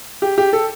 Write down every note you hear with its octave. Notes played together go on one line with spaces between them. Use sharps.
G4
G4
A4